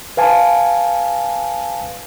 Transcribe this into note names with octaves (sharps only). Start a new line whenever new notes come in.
B4 F5 G#5 A5